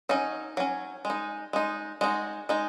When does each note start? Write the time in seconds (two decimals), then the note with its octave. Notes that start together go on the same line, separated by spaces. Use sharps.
0.09 F#3 C#4 D#4
0.57 F#3 C#4
1.05 G#3
1.10 D#4
1.53 G#3 D#4
2.01 G#3 D#4 F#4
2.49 G#3 D#4